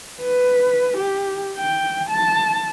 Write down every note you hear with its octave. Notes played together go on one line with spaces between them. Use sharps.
B4
G4
G5
A5